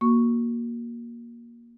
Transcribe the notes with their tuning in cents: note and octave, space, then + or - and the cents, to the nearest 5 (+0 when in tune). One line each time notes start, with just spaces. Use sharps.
A#3 +15 F#4 +0 C#6 +0